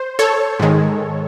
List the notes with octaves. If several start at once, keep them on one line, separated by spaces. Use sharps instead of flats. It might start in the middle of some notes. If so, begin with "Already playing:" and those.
Already playing: C5
A4 C#5
G#2 D#3 G#3